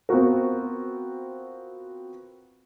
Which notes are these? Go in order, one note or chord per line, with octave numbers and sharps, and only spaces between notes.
B3 C4 F4 F#4 A#4